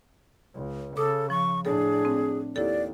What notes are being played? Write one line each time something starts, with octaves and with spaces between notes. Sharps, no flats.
C#2
C#3 A4 D6 D#6
F3 C#6
A2 D4 G#4 A4
C4
D#2 E4 G4 A4 D5